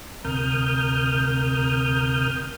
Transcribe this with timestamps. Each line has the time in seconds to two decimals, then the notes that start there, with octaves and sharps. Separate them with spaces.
0.25 D2 C3 A#4 D#6 F6 G6